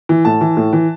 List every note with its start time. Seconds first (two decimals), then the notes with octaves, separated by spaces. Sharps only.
0.09 E3
0.25 A2 A5
0.41 E3
0.57 A2
0.73 E3